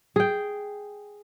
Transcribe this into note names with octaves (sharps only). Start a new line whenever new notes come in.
G#4 G5